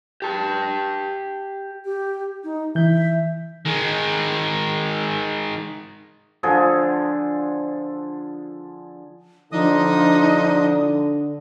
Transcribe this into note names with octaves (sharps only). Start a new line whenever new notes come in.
G4 A5
G4
D#4
E3 E5 G6
D#3 G#3
D3 F3 G#4 A4
D3 F3 D4 D#4 D#5 D#6